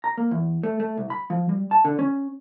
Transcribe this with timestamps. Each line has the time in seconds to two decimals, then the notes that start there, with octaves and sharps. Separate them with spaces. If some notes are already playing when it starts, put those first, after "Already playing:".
0.04 A#5
0.17 A#3
0.31 E2
0.63 A3
0.80 A3
0.97 C2
1.10 B5
1.30 F3
1.49 G3
1.71 A5
1.85 D3
1.99 C#4